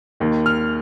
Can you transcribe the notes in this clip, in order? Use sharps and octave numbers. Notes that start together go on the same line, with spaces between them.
D#2 D#3
F6